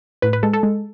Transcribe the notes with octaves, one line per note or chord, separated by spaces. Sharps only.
A2 B4
B4
G#3 A4
A4
G#3